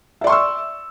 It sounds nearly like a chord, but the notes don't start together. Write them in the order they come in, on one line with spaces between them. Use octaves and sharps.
E5 D5 C6 C#6 E6